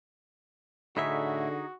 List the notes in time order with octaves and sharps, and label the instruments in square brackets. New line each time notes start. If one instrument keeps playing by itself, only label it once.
[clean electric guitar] A2 E4 E5 [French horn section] D3 [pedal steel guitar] D#4 G#4 [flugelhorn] F#4